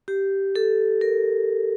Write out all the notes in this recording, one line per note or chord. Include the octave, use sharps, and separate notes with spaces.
G4
A4
A#4